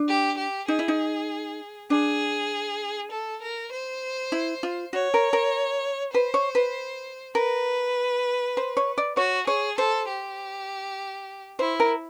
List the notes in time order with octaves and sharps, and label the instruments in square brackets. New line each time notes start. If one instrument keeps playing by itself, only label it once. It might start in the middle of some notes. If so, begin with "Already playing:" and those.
Already playing: [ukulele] D4
[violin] G4
G4
[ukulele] D#4 [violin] G#4
[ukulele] E4
D#4
[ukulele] D4 [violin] G#4
[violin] A4
A#4
C5
[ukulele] E4
F4
[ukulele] F#4 [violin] C#5
[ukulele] A#4
A#4
[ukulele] B4 [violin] C5
[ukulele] C#5
B4
[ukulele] A#4 [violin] B4
[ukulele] C5
C#5
D5
[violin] F#4 [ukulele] C#5
[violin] G#4 [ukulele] C#5
[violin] A4 [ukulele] C5
[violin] G4
[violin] E4 [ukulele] C5
[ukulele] A#4